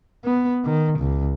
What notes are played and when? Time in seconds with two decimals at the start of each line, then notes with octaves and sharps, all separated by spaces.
0.25 B3
0.65 D#3
1.00 C#2